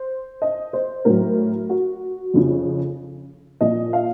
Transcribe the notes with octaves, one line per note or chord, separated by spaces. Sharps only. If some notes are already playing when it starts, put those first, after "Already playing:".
Already playing: C5
D#5
C5
A2 F#3 A#4
F#4
F2 C#3 F3
A#2 F3 D#5
F5